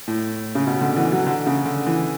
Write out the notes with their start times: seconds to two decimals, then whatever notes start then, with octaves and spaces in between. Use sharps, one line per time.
0.07 A2
0.55 C#3
0.67 B2
0.81 D3
0.97 E3
1.12 F#3
1.27 D3
1.47 C#3
1.66 D3
1.87 E3